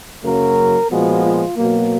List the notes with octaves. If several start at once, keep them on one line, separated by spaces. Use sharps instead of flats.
F#2 C#3 F#3 A#3 A#4
A#2 F3 G#3 B3 F#4
F4
B2 F#3 A#3